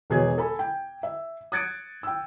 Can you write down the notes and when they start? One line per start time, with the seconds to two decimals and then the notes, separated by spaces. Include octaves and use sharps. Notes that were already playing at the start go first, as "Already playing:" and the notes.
0.10 E1 B2 G#4 C#5 G#6
0.38 A4 G#5 B5
0.59 G5
1.03 E5
1.52 D#6 F#6 G#6 A6 C#7 D7
2.03 G5 E6